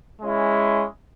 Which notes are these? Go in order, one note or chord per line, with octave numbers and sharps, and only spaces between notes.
G#3 C#4 E4